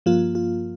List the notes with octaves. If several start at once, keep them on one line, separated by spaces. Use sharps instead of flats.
G2 F3 A#3 F4
F4